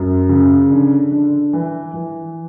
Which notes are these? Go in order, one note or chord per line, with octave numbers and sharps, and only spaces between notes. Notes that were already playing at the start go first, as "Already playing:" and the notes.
Already playing: F#2
C#3
D3
D3
E3
E3